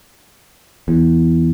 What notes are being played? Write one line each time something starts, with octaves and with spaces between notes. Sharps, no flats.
E2